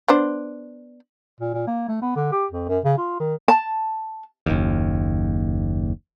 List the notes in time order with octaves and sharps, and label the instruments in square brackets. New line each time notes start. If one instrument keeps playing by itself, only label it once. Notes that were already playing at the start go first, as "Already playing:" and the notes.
[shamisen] B3 D4 C5
[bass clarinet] A#2
A#2
A#3
A3
B3
D3
G4
F2
F#2
C#3
F4
D#3
[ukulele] A5
[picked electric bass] F#1 D#2